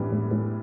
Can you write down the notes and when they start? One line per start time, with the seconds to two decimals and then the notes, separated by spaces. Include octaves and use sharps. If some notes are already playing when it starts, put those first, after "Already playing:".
Already playing: F#2 A2 E3 G3 B3 D4
0.12 A2
0.31 A2